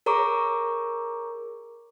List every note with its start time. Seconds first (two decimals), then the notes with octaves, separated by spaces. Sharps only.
0.06 G#4 A#4 C#5 A#5 C#6 D6